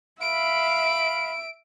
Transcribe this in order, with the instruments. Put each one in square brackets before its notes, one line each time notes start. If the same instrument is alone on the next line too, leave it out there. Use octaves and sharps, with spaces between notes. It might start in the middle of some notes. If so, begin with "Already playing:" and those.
[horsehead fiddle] E5 [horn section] F5 B5 [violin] D7